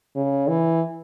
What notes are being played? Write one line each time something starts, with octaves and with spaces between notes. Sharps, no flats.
C#3
E3